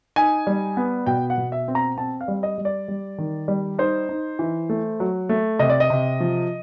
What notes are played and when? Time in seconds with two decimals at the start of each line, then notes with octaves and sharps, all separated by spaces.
0.16 D#4 G#5
0.47 G3
0.77 B3
1.06 B2 G5
1.30 F#5
1.38 B2
1.52 E5
1.68 C4
1.75 A#5
1.97 C4 A5
2.21 F5
2.28 G3
2.43 D#5
2.58 G3
2.65 D5
2.88 G3
3.18 D#3
3.48 G3
3.78 D#4 C5
4.09 D#4
4.39 E3
4.69 A3
5.00 F#3
5.29 A3
5.59 C3 D#5
5.70 D5
5.80 D#5
5.90 C3
6.20 F3